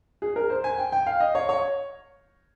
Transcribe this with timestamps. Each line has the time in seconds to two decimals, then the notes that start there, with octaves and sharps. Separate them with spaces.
0.22 G#4
0.36 A#4
0.50 C5
0.64 G#5
0.78 G5
0.92 G5
1.06 F5
1.20 D#5
1.35 C#5
1.49 C#5